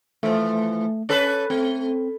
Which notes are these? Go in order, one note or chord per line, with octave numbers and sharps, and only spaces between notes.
E3 F3 A3
C#4 A4 B4
A3 C4